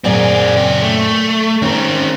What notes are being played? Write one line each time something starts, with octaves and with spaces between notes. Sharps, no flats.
F#2 A#2 C4 G#4 D5
C#3 G5
A3
D#3 C4 C#4 A#4